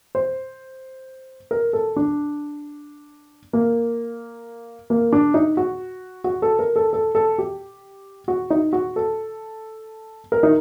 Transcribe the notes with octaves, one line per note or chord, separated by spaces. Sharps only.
C5
A#4
A4
D4
A#3
A#3
D4
D#4
F#4
F#4
A4
A#4
A4
A4
A4
G4
F#4
D#4
F#4
A4
A#4
D#4